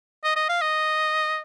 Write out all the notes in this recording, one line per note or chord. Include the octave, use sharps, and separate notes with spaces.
D#5
D#5
F5
D#5